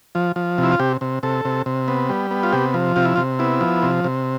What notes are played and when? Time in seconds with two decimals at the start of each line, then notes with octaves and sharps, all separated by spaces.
0.15 F3
0.36 F3
0.58 C3 E4
0.72 F4
0.80 C3 G4
1.01 C3
1.23 C3 A4
1.45 C3
1.66 C3
1.88 B3
2.09 G3
2.31 B3
2.43 F4
2.53 C3 G4
2.74 F3
2.96 C3 F4
3.06 E4
3.16 C3 F4
3.39 B3 E4
3.61 F3
3.83 C3
4.04 C3